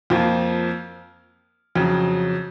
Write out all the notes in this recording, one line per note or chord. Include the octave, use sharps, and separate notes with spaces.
F2 F3 A#3 F4
F2 C#3 F#3